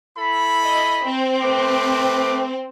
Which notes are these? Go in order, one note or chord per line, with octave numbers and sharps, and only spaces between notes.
E4 A4 B5
D#5
C4
A3 B4 D6